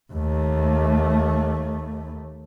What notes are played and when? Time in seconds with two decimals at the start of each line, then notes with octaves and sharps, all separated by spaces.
0.13 D#2 A3